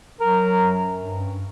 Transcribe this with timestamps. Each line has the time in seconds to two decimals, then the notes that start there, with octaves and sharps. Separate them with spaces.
0.21 F#3 A#4
0.59 F#2
0.97 G2